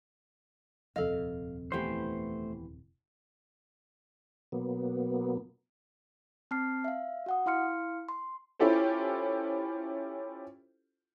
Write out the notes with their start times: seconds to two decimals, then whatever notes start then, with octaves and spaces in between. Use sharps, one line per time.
0.96 D#1 F2 C3 A4 D#5 F5
1.72 E3 A3 B3 G4 C5
4.52 B2 F#3 A#3 B3
6.51 C4 A5 F6 C7
6.84 E5 F5
7.26 F#4 F#5 D#6
7.46 E4 F5 C6 F6 C#7
8.09 C6
8.59 C#4 E4 F4 G4 A4 C5